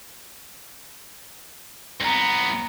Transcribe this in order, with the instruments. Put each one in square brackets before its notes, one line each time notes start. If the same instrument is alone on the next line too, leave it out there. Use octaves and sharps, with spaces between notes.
[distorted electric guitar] C2 B3 [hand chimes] A#5 A#6